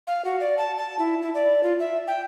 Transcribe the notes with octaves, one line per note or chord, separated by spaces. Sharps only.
F5
F#4
D5
A5
A5
E4
E4
D5
F4
E5
G5